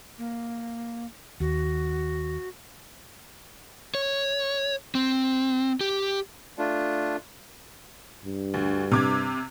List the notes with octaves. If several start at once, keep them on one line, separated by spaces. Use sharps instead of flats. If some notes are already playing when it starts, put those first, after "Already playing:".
A#3
D#2 F#4
C#5
C4
G4
A3 D4 F4
G2
D2
C3 D6 G#6